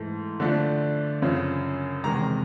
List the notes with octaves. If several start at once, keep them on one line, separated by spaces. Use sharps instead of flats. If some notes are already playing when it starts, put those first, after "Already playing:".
Already playing: G#2 E3 A3
D3 F3 A3 D4
F#2 C#3 F3
E2 C3 D#3 G#3 A#5